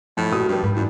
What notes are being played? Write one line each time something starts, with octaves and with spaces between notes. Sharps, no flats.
F2 A2
A#1 F#4 G4 D#6
G2 G3 G4
G#2 B5
F#2 E3 D4